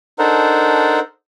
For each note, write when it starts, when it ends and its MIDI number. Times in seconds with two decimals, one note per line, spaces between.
0.19 0.99 62
0.19 0.99 63
0.19 0.99 69
0.19 0.99 70
0.19 0.99 72
0.19 0.99 78